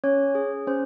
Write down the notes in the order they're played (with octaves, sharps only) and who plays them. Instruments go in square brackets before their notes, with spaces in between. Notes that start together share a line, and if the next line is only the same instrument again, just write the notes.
[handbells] C#4 C#5
G#4
C#4 C5